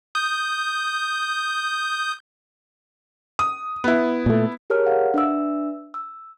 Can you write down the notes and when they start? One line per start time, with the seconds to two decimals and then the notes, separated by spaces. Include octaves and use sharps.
0.15 D#6 G6
3.39 D#6
3.84 B3 E4
4.26 A#2 A3
4.70 G4 G#4 A#4 C#5 A5 F6
4.86 F5 F#5
5.14 D4 B4 E5 E6
5.94 E6